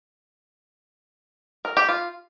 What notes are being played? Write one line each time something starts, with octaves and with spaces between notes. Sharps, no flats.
A#4
G4
F4